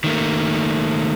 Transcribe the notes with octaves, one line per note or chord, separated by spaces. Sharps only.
D#3 A3 A#3